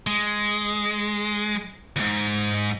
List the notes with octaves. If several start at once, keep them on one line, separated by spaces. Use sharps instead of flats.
G#3
D#2 G#2